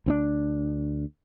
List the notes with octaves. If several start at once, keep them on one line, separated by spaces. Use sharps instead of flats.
D2 C4 D4